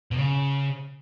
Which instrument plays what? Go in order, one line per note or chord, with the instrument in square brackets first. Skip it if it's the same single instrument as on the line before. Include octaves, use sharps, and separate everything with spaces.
[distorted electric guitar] B2
C#3